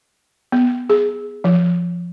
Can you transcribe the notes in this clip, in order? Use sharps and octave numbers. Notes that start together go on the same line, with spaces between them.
B3
G#4
F3